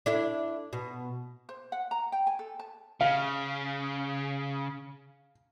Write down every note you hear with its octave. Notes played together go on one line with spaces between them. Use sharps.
D4 E4 A4
B2
C5
F#5
A#5
G5
G#5
A4
A5
C#3 F5